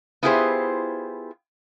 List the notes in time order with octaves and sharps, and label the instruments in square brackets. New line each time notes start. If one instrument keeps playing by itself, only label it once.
[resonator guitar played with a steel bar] B3 E4 F4 G4 G#4 C5